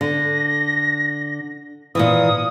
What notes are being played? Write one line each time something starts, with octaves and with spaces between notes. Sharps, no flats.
D3 A#6
A#2 D#3 E3 D#6